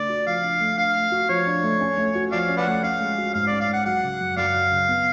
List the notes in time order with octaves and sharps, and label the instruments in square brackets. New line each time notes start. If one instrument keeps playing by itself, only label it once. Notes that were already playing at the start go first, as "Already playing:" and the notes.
Already playing: [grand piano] C#3 A3 D4 [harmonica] D5
[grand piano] F#4
[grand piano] F3 [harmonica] F5
[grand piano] D4
A3
[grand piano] D4 [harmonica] F5
[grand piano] A3
F#4
[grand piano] F3 [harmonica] C#5
[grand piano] D4
A3
C#4
A3
F#4
[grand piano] F3 [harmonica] D5 F5
[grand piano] C#4
[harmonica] B4 D5 F#5
[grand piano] A3
[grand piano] C#4 [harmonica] F5
[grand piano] G#3
F#4
[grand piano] G#2 [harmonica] F5
[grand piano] C#4 [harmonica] D5
[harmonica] F5
[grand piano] G#3 [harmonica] F#5
[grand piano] F#3 [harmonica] F#5
[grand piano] C#3
F#2
[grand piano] F#2 [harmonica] D5 F5
[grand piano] F#3
C#3
B3